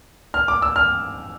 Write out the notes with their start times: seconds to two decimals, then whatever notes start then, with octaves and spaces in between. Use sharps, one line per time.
0.34 F6
0.48 D6
0.62 E6
0.76 F6